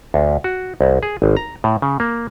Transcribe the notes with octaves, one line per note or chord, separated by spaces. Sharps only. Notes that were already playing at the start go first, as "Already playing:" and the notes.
D2
F#4
C2
G#4
G#1
A#5
A2
C#3
A#3